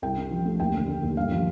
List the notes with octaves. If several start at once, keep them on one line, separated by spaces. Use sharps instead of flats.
C2 G5
C3
F3
A3
D#2 G5
D3
A3
D#2
G2 F5
F3